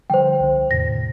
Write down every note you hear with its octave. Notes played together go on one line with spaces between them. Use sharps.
D3 F3 G3 C5 G5
C2 D3
E2 A2 C3 A#6